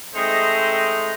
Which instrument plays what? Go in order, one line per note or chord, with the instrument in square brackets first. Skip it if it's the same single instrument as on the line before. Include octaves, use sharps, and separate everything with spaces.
[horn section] G#3 A3 C4 D#4 C5 D#5